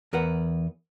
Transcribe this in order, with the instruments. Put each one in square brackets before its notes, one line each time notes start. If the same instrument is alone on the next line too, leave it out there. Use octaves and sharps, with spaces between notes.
[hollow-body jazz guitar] E2 A#4 B4 F#5